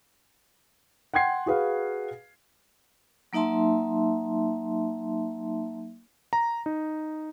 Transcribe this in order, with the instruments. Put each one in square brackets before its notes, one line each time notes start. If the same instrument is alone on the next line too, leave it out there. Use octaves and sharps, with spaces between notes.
[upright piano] F#5 G5 C6 G#6 C7
F#4 G#4 B4 F5
[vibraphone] F#3 A#3 D#4 E5 A5 C6
[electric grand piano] A#5
D#4